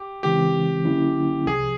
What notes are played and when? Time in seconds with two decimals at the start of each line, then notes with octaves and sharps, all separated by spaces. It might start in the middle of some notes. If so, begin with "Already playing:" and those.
Already playing: G4
0.23 C#3 E3 G#3 C4 G4
0.85 D3 F#3 A#3 C#4 E4
1.47 C2 C3 F3 G#4